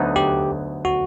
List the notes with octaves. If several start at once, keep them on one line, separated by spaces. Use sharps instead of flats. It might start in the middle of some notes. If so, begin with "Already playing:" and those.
Already playing: D2 D3 F#3 B3 D#4
G4
F#4